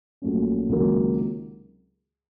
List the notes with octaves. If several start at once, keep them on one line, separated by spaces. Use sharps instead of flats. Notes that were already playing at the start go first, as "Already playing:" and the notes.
A#1 A#2 F#3 A3 C#4
C#2 C3 D#3 F#3 A#3